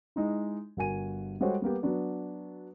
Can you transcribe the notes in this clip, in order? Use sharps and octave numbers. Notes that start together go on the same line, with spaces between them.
G#3 D#4 E4
G1 F#4 A#4 G#5 D#7
G3 G#3 F#4 A4 C5 C#5
G3 A#3 B3 G4
F#3 B3 D4